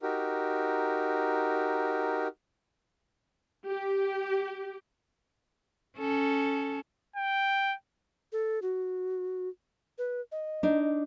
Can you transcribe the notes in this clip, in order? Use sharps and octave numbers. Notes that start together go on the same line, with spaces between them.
D#4 F#4 G4 A#4
G4
C#4 A4
G5
A4
F#4
B4
D#5
D4 D#4